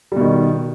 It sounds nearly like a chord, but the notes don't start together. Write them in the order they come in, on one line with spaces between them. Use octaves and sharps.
G3 B2 D#3